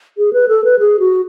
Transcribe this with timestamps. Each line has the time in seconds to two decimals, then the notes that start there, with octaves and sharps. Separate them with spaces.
0.18 G#4
0.33 B4
0.48 A4
0.64 B4
0.79 G#4
0.99 F#4